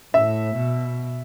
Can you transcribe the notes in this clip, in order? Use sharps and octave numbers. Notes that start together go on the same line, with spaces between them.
A2 E5
B2